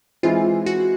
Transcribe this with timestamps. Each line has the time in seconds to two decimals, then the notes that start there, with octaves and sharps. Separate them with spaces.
0.23 E3 G#3 C4 E4 F4
0.66 F#4